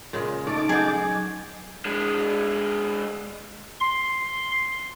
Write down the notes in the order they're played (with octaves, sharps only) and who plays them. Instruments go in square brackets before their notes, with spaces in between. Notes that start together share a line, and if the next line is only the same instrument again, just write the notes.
[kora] A#2 C#3 G#3
[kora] A3 [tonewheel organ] D#4 A5 D6
[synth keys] F#3 G6 [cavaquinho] G#4 F#5
[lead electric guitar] G#3 D4
[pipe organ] C6